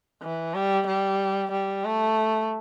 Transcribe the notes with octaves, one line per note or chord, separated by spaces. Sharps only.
E3
G3
G3
G3
A3